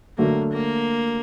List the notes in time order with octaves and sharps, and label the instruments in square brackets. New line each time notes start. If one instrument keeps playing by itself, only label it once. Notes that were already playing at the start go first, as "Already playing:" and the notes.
[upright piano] D3 F#3 A3 [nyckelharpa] A#3
[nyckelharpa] A#3